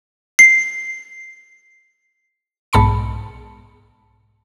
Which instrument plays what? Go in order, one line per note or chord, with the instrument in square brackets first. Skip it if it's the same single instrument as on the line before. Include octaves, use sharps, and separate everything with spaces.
[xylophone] C7
[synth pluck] B1 G#2 A5 B5 C#7